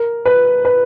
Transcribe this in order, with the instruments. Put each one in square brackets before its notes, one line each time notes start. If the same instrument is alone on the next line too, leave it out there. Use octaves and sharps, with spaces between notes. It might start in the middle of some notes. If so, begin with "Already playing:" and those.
Already playing: [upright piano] A#4
B4
B4